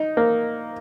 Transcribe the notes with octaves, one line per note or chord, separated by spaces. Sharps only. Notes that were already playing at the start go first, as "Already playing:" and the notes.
Already playing: D#4
A#3